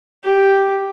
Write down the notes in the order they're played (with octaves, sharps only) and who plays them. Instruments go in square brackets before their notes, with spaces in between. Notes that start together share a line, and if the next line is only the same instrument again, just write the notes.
[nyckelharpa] G4